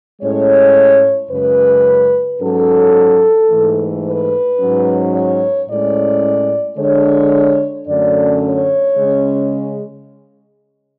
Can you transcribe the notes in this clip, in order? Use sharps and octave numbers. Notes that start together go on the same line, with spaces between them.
A2 G#3 C#4 C#5
F#2 C#3 G#3 B4
G#2 F#3 C#4 A4
G#2 E3 A3
B4
G#2 F#3 C#4
C#5
A2 G#3 C#4 D5
D3 G#3 D4 C#5
F#2 D3 A3 C#4 D5
C#5
C#3 G#3 C#4